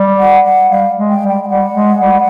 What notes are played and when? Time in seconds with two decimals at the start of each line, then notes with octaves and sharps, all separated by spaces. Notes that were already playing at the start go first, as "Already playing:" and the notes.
Already playing: G3
0.19 F#5
0.44 F#5
0.70 G3 F5
0.97 G#3
1.10 G5
1.21 G3
1.28 G5
1.44 G5
1.48 G3 F#5
1.74 G#3
2.00 G3